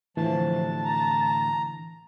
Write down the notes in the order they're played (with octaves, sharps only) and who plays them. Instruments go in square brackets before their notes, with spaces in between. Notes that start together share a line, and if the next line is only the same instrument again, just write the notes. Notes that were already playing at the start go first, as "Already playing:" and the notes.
[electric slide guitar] A2 D3 [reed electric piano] E3 [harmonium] F3 [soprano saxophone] A5
[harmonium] A#5